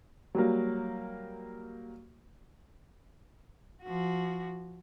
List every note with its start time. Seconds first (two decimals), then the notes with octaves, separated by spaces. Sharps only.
0.35 F#3 G3 A#3
3.83 F3 F#4